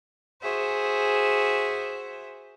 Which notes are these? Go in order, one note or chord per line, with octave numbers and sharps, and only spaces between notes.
F#4 G#4 C5 E5